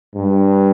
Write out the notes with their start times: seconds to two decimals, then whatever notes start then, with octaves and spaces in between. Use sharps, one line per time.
0.15 G2